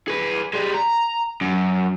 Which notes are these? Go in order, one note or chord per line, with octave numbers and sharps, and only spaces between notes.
G#4 B4
G3 G#3
A#5
F#2